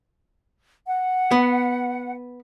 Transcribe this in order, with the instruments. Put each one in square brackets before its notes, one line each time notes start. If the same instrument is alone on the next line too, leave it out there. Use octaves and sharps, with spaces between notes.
[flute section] F#5
[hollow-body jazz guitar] B3